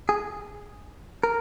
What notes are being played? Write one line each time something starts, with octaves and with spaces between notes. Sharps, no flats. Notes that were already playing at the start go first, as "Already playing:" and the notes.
G#4
A#4